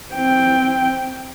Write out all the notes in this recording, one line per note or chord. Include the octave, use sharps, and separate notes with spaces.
C4 G5